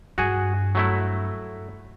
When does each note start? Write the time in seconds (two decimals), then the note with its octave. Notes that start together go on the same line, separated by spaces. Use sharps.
0.18 G2 F#4 G#4 G#5
0.75 F#3 A3 E4